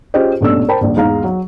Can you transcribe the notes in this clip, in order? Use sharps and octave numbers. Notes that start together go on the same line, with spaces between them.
C#4 F4 G4 G#4 C5 D#5
A#1 G2 B2 A3 C#4 E6
A#4 C5 G5 A5 B5
D#1 A#1
E2 G#2 F5 A#5
F#3